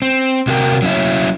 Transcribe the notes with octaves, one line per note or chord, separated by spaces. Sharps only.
C4
C3 F#4 A#4 G5
F#3 C#4 E4